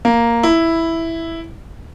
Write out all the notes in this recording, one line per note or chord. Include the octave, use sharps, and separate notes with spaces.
A#3
E4